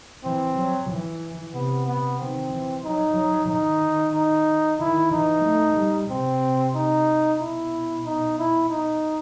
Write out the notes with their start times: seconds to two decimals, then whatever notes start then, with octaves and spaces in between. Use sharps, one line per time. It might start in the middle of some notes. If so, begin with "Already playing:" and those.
0.24 E3 C4
0.57 F#3
0.90 E3
1.54 C3 B3
1.87 B3
2.19 D#3 C4
2.52 E3
2.85 F#3 D#4
3.16 F#3
3.50 D#3 D#4
4.14 D#4
4.80 D#3 E4
5.13 E3 D#4
5.45 A3
5.77 G3
6.10 C3 C4
6.75 D#4
7.40 B2 E4
8.06 D#4
8.39 E4
8.70 D#4